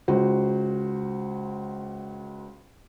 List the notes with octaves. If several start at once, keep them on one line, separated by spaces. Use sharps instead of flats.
C#2 F#4 C5